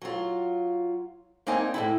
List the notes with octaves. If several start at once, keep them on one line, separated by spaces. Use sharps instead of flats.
F#3 F4
A#3 C4 D4 D#4 G#5
A2 A3 E4